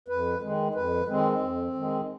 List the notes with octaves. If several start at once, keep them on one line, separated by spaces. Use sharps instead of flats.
F2 B4
D#3 G#3
F2 B4
D#3 G#3 C4
F2
D#3 G#3